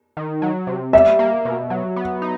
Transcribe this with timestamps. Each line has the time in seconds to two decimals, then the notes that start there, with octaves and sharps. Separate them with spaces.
0.17 D#3
0.42 F#3
0.67 C3
0.93 G3 E5
1.19 A#3
1.45 B2
1.70 F#3
1.96 B3
2.22 D#4